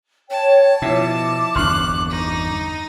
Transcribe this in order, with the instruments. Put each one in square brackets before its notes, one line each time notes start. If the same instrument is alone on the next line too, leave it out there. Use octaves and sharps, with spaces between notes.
[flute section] C#5 G5 [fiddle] A5
[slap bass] B2 [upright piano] F3 E4 [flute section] D6
[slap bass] G1 E2 D4 [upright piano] C6 C#6 F6 [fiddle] F#6
[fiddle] D#4